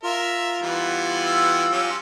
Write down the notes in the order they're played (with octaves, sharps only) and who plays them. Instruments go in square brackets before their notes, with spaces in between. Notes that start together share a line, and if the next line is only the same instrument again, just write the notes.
[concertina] F4 [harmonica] A#4 E5
[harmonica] E3 G3 B3
[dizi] E6
[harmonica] F#3 C#4 G4